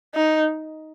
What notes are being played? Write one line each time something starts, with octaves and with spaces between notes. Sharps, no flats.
D#4